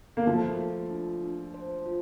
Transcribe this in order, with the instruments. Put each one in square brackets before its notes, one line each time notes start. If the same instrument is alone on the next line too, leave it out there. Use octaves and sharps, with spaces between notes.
[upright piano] A#3
[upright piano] F3 A3 [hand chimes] F4
[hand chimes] F4
D4
D4
C5
F4